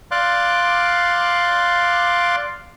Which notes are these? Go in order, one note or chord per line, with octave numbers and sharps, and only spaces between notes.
D5 F5 C6 D6 F#6